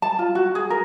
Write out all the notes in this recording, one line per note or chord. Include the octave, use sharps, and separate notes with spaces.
A5
F4
F#4
G#4
A#4